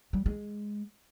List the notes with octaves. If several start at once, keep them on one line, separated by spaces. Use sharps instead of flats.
G3
G#3